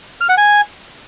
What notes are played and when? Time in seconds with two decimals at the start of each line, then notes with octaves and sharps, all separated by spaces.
0.21 F6
0.29 F#5
0.38 G#5